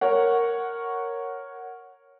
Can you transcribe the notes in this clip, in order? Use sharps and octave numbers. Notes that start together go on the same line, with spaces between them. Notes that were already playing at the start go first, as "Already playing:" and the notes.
A#4 C#5 F#5